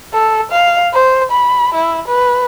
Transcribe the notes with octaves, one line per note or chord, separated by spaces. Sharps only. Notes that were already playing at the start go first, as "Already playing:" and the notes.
A4
F5
C5
B5
E4
B4